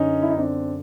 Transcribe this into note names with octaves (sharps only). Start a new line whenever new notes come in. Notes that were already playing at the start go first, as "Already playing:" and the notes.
Already playing: F#2 D3 C#4 D#4
E4
D#4
C4 D4